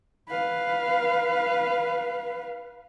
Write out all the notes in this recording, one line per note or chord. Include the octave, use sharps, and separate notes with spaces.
B4 F5